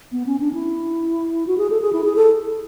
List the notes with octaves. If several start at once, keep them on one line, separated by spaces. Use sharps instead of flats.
B3
C#4
D4
E4
F#4
G#4
A4
G#4
E4
G#4
A4